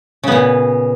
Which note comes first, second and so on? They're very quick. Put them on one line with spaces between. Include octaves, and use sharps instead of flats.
C#3 B3 A#2